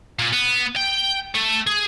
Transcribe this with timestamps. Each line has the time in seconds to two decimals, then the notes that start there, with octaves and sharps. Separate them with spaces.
0.19 A#2
0.33 B3
0.76 G5
1.35 A3
1.67 G#4